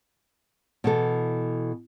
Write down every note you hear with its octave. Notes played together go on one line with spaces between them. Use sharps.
B2 E3 A4